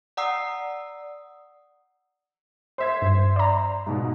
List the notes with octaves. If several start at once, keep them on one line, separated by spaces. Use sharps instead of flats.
D5 F#5 A#5 D#6 E6 C7
C5 E5 G#6
G2
D5 A#5
G#2 B2